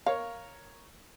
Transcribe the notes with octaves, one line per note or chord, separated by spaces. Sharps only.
A#4 C#5 F5